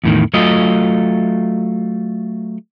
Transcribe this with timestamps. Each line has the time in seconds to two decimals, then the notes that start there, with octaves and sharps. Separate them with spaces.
0.04 E2 A2 D#3
0.34 F#3 A3 F4 D#5